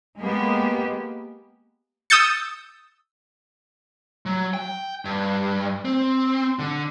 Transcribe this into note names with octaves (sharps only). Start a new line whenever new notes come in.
G#3 A#3 B3 G4
D#6 E6 G6 A6 C#7
F#3
G5
G2
C4
D3